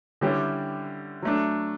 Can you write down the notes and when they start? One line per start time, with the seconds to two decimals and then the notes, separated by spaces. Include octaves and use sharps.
0.21 D3 G3 C#4 E4 G4
1.22 F#3 A3 D4